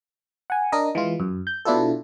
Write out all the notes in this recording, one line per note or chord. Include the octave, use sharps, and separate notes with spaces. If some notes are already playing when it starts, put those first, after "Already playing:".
F#5 G#5
D4 A#4 D#5
E3 G#3 F4
F#2
G6
B2 D4 E4 F4 A4